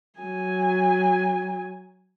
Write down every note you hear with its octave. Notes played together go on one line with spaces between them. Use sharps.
F#3 G#5